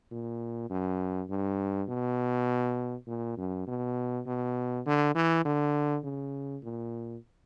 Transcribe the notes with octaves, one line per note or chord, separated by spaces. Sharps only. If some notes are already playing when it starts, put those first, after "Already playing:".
A#2
F#2
G2
B2
A#2
F#2
B2
B2
D3
E3
D3
C#3
A#2